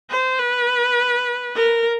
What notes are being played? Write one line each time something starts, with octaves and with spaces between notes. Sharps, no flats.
C5
B4
A#4